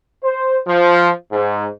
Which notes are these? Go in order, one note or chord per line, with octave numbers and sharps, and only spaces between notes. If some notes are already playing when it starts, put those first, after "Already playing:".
C5
F3
G#2